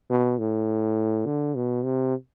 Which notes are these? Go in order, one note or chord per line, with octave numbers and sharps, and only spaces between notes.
B2
A2
D3
B2
C3